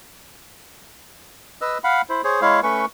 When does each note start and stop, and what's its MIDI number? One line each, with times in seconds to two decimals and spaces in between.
1.61 1.78 71
1.61 1.78 75
1.61 1.78 88
1.84 2.02 77
1.84 2.02 78
1.84 2.02 83
2.09 2.22 64
2.09 2.22 72
2.24 2.41 68
2.24 2.41 72
2.24 2.41 73
2.42 2.60 56
2.42 2.60 64
2.42 2.60 73
2.42 2.60 77
2.63 2.86 57
2.63 2.86 61
2.63 2.86 71
2.63 2.86 85